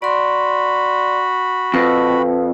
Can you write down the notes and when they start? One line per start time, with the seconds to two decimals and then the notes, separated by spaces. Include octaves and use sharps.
0.02 F#4 D5 B5 C6
1.74 F2 B4